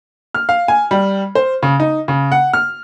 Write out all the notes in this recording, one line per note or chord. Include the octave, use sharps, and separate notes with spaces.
F6
F5
G#5
G3
C5
C#3
D#4
C#3
F#5
F6